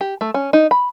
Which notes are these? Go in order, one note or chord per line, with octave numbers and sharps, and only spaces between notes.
G4
A3
C#4
D#4
B5